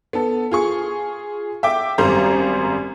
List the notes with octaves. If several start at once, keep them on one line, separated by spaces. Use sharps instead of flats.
B3 A4
F4 G#4 C#6
E5 G5 D6
G#1 F#2 G3 C5 A#5